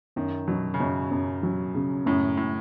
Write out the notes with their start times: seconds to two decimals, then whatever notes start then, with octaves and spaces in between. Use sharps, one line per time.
0.16 F#2 D#3
0.48 B2 F#3
0.74 C#3
0.80 F#2 B2
1.11 F#2
1.43 F#3
1.75 C#3
2.06 F#2 A2
2.37 A2